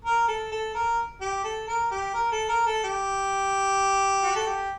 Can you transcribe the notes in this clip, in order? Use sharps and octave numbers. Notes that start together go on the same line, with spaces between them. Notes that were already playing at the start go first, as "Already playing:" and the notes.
A#4
A4
A4
A#4
G4
A4
A#4
G4
A#4
A4
A#4
A4
G4
F#4
A4
G4